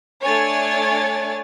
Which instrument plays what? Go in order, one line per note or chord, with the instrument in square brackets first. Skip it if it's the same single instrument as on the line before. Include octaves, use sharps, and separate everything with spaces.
[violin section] A3 D4 C#5 D5 G#5 A6